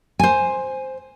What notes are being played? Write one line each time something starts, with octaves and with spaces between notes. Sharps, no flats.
C5 G#5